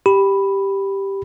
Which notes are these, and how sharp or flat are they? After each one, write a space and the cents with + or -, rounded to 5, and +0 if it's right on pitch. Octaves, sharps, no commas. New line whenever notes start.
G4 +0 B5 +0